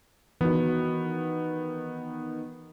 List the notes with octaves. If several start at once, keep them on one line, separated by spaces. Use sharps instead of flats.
D#3 E3 B3 F#4